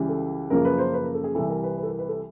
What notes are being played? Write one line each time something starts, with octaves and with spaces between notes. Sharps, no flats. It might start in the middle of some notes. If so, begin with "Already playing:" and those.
Already playing: C#2 C#3 E3 G3
A4
F#2 C#3 F3 A#3 A#4
B4
C5
B4
A#4
A4
G#4
C2 C3 E3 A4
A#4
B4
B4
A4
A#4
B4
A4